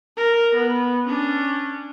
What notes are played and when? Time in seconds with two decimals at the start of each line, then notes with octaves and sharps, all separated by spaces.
0.17 A#4
0.55 B3
1.06 C#4 D4